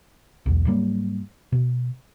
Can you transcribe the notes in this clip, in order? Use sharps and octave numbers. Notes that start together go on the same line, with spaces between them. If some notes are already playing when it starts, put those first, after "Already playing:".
B1 E2
G#2 F#3 G3 A#3
B2